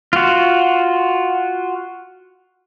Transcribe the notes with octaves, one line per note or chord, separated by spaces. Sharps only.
F4 F#4